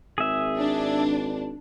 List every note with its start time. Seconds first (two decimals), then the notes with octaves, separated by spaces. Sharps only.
0.18 G#1 G#4 E5
0.58 D4